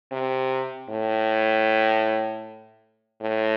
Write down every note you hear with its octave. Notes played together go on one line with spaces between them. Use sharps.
C3
A2
A2